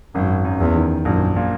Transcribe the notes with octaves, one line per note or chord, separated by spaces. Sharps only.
G#1 F#2
F#2
E2
D#3
A#1 F#2
A#2